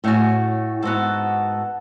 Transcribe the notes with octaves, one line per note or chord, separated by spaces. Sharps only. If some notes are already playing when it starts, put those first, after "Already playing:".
A2 A3 C#4 F#4
G#2 B3 F#4 A4